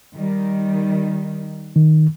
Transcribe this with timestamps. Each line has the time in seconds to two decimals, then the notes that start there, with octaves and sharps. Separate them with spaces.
0.15 D#3 G3
1.76 D#3